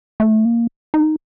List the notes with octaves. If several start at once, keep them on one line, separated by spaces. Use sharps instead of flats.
A3
A#3
D#4